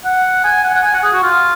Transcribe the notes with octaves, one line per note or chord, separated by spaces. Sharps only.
F#5
G#5
F#5
F#5
G#5
F#5
G#4
F#4
F4